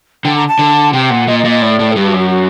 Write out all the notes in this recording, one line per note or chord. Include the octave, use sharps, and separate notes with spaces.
D3 G5
A#5
A5
D3
C3 G5
A#2 F#5
A#2 D#5
D#5
A#2
D#5
A2 D5
A2
A4
G2 G4
F#4
F#2
F#4
F#4